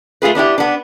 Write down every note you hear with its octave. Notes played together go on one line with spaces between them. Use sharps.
A3 F4 G#4 B4
B3 D4 E4 G4
B3 D4